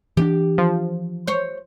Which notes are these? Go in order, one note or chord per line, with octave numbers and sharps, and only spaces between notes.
E3 C4 D4 G4
F3
C5 C#5